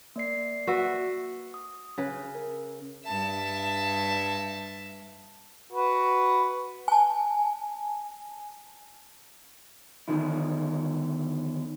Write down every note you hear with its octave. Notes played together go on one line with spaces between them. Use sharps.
A#3 D5 C7
F#4 B4 E5
D#6
C#3 B4
A#4
G2 E5 A5
F#4 B4
G#5 A5
E2 D3 D#3 E4